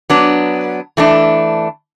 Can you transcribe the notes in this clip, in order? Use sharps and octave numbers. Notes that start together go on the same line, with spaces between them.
F#3 B3 D4
E3 A3 D4